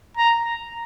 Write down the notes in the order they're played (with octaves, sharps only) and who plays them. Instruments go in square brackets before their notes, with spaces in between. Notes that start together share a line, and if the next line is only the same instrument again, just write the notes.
[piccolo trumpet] A#5